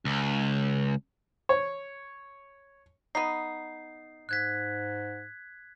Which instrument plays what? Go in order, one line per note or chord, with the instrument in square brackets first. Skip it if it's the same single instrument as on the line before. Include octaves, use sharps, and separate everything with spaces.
[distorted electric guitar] C#2
[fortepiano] C#5
[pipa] B3 D#4 [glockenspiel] C7
[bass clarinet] G#2 [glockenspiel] F#6 G#6 B6